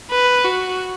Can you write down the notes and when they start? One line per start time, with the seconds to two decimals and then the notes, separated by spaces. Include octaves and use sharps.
0.11 B4
0.44 F#4